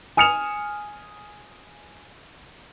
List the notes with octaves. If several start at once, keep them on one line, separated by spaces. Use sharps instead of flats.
G#5 D#6 F6 C#7 E7 F7